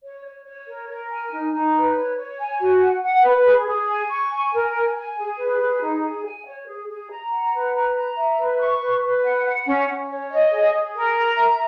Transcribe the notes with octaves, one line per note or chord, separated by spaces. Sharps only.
C#5
C#5
C#5
A#4
A#4
G#5
D#4
D#4
B4
C#5
C#5
G#5
F#4
F#5
F#5
B4
G#4
G#4
G#5
C#6
G#5
A#4
G#5
G#5
G#4
B4
G#4
D#4
G#4
G#5
C#5
G#4
G#4
A#5
F#5
B4
A#5
A#5
E5
B4
C#6
B4
B4
F#5
F#5
C#4
C#4
C#5
D#5
G#4
G#4
A#4
A#5
E5